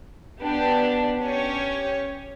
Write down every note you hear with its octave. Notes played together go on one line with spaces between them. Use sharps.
B3 D4 G4
C#4 G4 C#5